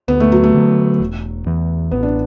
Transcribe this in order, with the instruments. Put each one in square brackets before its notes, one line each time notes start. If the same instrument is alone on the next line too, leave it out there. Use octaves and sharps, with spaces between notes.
[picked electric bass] D2 [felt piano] B3
[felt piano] A3
F#3
A3
[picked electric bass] D3 F#3
E1
E2 E3
[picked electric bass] A1 [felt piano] B3
[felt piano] D4